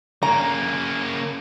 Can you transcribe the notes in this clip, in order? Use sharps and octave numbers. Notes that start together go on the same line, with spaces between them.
C#3 A#3 A#5